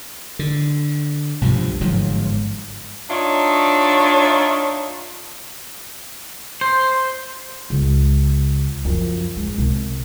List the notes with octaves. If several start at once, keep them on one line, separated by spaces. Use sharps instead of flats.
D3
B1 G2 C3 F3
G1 G#2 F3 F#3
D4 D#4 F4 C#5 E5
C5
C#2
F#2 F3
G#2
C2